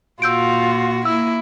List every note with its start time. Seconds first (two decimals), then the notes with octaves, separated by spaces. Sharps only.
0.22 A#2 F4 F#4 E6 G6 D7
1.05 A#3 E4 E6